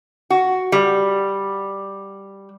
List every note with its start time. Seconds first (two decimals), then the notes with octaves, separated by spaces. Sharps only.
0.30 F#4
0.72 G3